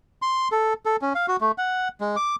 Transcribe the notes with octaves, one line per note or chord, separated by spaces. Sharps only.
C6
A4
A4
C#4
F5
F#4
A3
F#5
G#3
D6